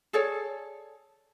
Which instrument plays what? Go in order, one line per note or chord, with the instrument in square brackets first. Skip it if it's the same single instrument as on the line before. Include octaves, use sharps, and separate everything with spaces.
[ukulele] G#4 A4 C#5 D5